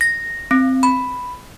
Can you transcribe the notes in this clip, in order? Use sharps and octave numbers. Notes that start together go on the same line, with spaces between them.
A#6
C4
B5